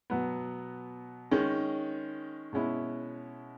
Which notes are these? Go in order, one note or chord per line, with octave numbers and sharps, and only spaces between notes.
B2 F#3 B3
D#3 G#3 C#4
B2 G#3 C#4 E4